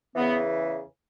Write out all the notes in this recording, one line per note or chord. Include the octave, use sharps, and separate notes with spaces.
E2 C#3 E3 B3